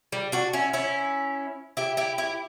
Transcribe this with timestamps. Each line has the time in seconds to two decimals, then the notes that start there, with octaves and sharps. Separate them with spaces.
0.12 G3
0.32 D4 F#4
0.53 C#4 E4
0.73 C#4 E4
1.77 E4 G4
1.97 E4 G4
2.18 E4 G4